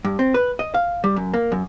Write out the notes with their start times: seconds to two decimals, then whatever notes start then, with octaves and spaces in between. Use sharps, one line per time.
0.05 G2
0.19 C4
0.34 B4
0.59 D#5
0.74 F5
1.04 G3
1.16 F#2
1.34 A#3
1.52 F#2